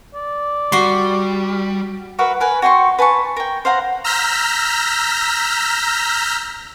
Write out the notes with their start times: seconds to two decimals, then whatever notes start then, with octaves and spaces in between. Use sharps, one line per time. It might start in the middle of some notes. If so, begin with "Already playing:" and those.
0.14 D5
0.72 G3 F#4 C6
2.19 F#4 A#4 B4 E5
2.40 A#4 B4 G#5
2.62 F#4 G5 C6 C#6
2.99 B4 G#5 A5 C#6
3.36 A#4 G5
3.65 C5 F5 F#5 A#5
4.04 A#5 E6 F6 G6 A#6 B6